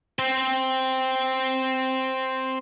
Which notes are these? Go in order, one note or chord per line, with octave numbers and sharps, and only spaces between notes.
C4 C5